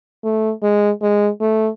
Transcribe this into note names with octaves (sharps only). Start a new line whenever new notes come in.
A3
G#3
G#3
A3